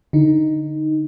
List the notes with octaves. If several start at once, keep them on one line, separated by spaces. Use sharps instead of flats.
D3 D#4